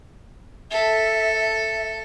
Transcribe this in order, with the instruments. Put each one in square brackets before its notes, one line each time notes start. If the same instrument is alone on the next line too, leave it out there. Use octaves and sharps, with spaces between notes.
[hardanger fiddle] A4 [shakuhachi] E5
[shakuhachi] E5